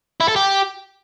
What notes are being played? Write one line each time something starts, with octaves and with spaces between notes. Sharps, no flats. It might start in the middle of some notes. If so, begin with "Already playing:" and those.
E4
A4
G4